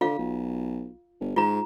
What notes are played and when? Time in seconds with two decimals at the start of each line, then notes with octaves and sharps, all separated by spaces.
0.01 D3 F4 F5
0.19 B1
1.21 G1
1.36 G#2 F4 A#5